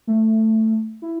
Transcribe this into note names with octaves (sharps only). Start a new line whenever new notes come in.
A3
E4